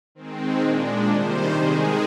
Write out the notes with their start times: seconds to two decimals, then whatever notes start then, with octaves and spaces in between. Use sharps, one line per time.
0.15 D#3 G#3 C4
0.61 A#2 G#3 D4
1.07 C3 D#3 G3 C5
1.53 D#3 G#3 G#4